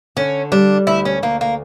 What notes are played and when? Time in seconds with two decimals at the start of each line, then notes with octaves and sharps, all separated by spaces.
0.16 D3 C#4
0.52 G3 D4
0.87 D2 E4
1.05 C#4
1.23 D2 A#3
1.41 A#3